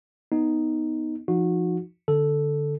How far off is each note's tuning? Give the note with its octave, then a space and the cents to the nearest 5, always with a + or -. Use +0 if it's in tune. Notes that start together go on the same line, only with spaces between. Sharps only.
B3 +0 D#4 +0
F3 -15 D#4 +0 F#4 -25
D3 +0 A4 +0